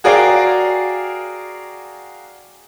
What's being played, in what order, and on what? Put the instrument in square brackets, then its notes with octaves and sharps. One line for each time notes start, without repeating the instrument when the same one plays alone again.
[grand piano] F#4 G#4 A#4 D5 F5 G5